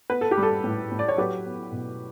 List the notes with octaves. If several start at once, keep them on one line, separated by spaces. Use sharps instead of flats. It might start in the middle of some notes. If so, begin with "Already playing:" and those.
B3 B4
A4
G4
G3
A4
A2
A2
D5
C#5
F#3 G4 B4
B3
B2